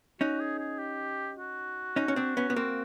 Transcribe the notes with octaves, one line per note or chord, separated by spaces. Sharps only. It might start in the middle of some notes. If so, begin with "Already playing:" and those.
C#4 D#4 F#4
G#4
G#4
G4
F#4
C#4 D#4
C#4
C4 D4
B3 C#4
B3
A#3 C4